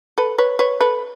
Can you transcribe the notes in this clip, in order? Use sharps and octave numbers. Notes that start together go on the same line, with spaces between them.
A4 B4
B4 C#5
B4 C#5
A4 B4